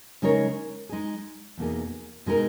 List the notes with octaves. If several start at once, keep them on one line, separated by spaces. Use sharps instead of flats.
C#3 G#3 D#4 A#4 C#5
G#3 D#4 G#4
E2 B2 A#3 D#4 G#4
B2 G#3 D#4 A#4